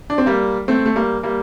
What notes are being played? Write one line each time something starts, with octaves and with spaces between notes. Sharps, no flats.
D4
C4
G3 A#3
A3 C4
A3
G3 A#3
G3 A#3